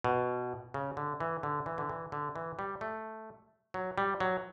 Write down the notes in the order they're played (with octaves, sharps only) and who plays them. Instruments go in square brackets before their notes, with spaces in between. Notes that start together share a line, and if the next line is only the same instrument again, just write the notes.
[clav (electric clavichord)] B2
C#3
D3
E3
D3
E3
D3
E3
D3
E3
G3
A3
F#3
G3
F#3